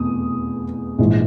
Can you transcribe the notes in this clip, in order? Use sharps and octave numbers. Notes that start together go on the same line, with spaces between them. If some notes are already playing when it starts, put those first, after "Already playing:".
Already playing: F1 E2 B2 D#6
A#1 G#2 E3